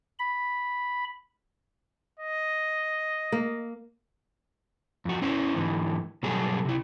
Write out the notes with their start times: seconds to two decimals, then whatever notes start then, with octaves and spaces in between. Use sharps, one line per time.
0.19 B5
2.19 D#5
3.32 A#3
5.05 F2 F#4
5.22 C#4 E4 C5
5.55 G#2 D3 E3
6.23 B2 F#3 G3 G#4 A4
6.65 C3 E4